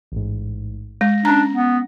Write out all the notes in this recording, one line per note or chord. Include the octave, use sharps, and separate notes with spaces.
A1 G#2
G#3 A#6
C#4 D4 A#5
B3